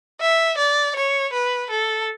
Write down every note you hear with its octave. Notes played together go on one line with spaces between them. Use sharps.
E5
D5
C#5
B4
A4